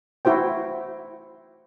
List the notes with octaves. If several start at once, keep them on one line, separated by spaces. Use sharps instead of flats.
E4 F#4 C5 G5